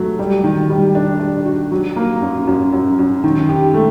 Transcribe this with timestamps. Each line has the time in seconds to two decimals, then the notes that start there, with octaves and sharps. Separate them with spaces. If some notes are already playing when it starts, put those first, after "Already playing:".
Already playing: F#3 A3
0.19 G3
0.44 D#3
0.70 G3
0.95 D4
1.20 D4
1.46 F#4
1.72 F#3
1.96 A#3
2.22 F#2
2.47 F#2
2.73 F#2
2.99 F#2
3.24 D#3
3.49 G4
3.74 A3